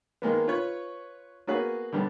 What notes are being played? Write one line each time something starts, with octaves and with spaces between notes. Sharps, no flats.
D#3 G#3 A#3 B3
F4 B4 C#5
A#3 B3 F#4 G#4 B4
D3 G3 B3